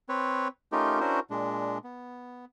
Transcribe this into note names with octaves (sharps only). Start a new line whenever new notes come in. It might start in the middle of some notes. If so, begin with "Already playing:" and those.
C4 B4 C#5
A3 C#4 D#4 F4 G4 A#4
C#4 D4 E4 F#4 A#4 C5
A#2 G#3 D4
B3